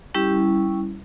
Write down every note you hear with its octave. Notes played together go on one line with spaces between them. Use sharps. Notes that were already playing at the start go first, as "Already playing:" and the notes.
G3 C#4 E4 G4